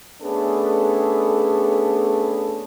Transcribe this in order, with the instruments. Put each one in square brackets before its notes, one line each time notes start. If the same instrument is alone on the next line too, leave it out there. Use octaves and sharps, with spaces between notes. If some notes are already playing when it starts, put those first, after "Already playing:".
[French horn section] A3 B3 C#4 D4 G#4 A4